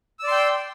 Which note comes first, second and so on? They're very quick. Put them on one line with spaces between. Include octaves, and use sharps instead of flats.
E6 D5 C6 G5